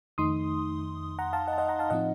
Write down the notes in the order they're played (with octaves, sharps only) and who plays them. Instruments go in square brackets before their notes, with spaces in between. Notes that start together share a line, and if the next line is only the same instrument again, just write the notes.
[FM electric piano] F2 D#3 A3 D#4 C6 D#6
F#5 A#5
F5 A5
D#5 F#5
A5
D#5 F#5
F#5 A#5
F5 A5
A2 F3 C4 D#4 D#5 F#5